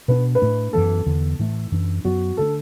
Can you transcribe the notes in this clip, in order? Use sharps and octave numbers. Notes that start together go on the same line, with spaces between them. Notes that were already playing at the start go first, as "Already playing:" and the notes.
B2 B3 D4 B4
B4
A2 A3 D4
F#2 E3 B3 A4
E2 D3 B3
A2 E3 A3
F#2 E3 D4
F#2 F#3 B3 F#4
D3 A3 D4 A4